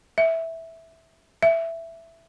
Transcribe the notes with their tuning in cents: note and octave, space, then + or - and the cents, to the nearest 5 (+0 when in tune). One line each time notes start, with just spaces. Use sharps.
E5 -5
E5 +10